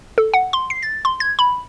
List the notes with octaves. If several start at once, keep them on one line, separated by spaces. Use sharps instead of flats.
A4
F#5
C6
C7
A6
C6
G#6
B5